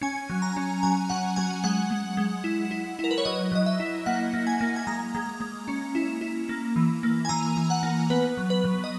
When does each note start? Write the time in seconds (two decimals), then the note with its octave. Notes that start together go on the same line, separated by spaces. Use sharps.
0.01 C#4 G#5
0.30 F#3
0.42 A#5
0.57 C#4
0.83 F#3 G#5
1.09 F#3 F#5
1.36 F#3 G#5
1.64 G#3 F#5
1.91 G#3
2.17 G#3
2.44 E4
2.71 E4
2.99 E4 A#4
3.11 B4
3.18 C#5
3.25 F#3 D#5
3.52 F#3 D#5
3.66 E5
3.80 E4
4.06 A#3 F#5
4.34 A#3
4.47 G#5
4.61 A#3
4.76 G#5
4.87 G#3 A#5
5.15 G#3
5.40 G#3
5.68 C#4
5.95 E4
6.21 E4
6.49 A#3
6.76 E3
7.03 A#3
7.25 G#5
7.29 E3 A#5
7.57 E3
7.70 F#5
7.83 A#3
8.10 B3 B4
8.37 F#3
8.50 B4
8.64 F#3
8.84 D#5